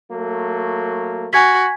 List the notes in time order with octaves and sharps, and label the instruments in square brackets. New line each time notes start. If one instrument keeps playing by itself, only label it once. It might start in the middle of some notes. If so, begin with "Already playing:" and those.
[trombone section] F#3 A3 A#3
[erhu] F#4 [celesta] G#5 G#6 B6